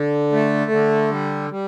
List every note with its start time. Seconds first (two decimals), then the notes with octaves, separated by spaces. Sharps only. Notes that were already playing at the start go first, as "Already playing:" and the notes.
Already playing: D3
0.32 A3
0.71 D3
1.11 G3
1.51 G3